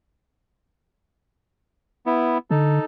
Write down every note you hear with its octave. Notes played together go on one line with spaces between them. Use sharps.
B3 E4
D3 D#4 A4